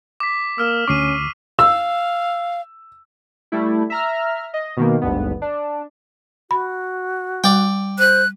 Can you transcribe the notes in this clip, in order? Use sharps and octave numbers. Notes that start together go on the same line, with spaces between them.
D6 B6
A#3 E6 F6 E7
D2 C#4 C#6 D6 C7 D#7
F5 E6
G3 A3 E4
E5 A#5 F6
D#5
B2 D#3 A#3
G#1 D2 G2 B3
D4
F#4 B5
G3 D5 G5
C5 F#6